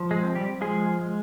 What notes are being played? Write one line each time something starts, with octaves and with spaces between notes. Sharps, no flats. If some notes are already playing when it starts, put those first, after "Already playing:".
Already playing: F3
G#3 G#4
C4
G3 G4
F3 G#3 G#4
G#3